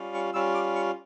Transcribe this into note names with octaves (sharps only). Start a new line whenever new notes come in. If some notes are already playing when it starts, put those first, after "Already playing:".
Already playing: G3 C#4 F4
C#6
G3 C#4 F4 E6
D6
C#6